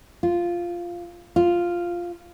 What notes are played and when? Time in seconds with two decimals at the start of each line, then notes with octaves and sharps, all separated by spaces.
0.23 F4
1.36 F4